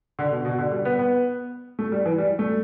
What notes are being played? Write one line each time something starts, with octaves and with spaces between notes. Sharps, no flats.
D3
B2
B2
D3
G3
B3
B3
A3
G3
E3
G3
A3